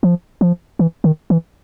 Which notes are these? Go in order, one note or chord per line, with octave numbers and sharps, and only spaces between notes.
F3
F3
E3
D#3
E3